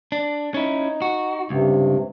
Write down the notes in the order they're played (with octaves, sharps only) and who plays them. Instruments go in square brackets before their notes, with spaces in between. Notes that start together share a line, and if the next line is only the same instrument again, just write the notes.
[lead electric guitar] D4
[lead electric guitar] C#4 E4 [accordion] D#4
[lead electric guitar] F#4
[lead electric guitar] C#2 [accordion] G2 C3